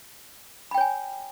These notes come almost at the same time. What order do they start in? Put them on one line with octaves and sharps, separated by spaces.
B5 G5 C#5 G#5